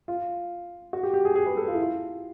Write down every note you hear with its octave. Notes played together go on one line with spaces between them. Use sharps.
F4
F#4
G4
G4
G#4
G#4
B4
A4
F4
E4
F4